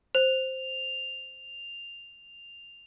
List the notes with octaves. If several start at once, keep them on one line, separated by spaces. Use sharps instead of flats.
C5 F7